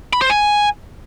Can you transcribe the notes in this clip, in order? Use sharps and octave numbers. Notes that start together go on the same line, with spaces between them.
B5
C5
G#5